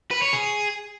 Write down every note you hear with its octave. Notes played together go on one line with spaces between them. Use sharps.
B4
C#5
G#4